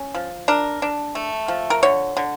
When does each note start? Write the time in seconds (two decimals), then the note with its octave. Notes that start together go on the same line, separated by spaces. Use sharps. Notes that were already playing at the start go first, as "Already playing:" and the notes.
Already playing: C#4
0.15 F3
0.48 D4 A#4
0.82 D4
1.15 A3
1.48 F3
1.70 A#4
1.83 D3 C#5
2.17 D3